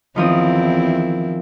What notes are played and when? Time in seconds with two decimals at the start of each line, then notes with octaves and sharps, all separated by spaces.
0.16 E2 D#3 F3 C4 E4 D#6